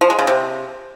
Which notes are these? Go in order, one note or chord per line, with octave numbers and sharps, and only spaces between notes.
F3
G#3
C#3
C3